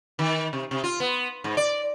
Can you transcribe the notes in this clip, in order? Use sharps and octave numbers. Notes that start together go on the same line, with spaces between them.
D#3
C3
C3
F4
B3
G#2
D5